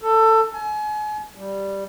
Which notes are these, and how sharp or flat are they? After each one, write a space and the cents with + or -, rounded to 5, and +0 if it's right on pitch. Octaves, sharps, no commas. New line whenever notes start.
A4 +20
G#5 +35
G3 +0